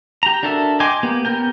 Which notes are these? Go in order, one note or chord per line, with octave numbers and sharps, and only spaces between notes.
G4 A#5
D4 F#4 A4 A#4 E5
D#5 G5 G#5 C6 D6
A#3 B3 G4
B3 C#4 G4 A#4 G5